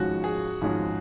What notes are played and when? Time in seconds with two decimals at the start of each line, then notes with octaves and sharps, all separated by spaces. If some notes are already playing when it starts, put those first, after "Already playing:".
Already playing: G#1 G#2 F3 G#3 C#4 F#4
0.24 G#4
0.61 G#1 G#2 F3 G#3 C#4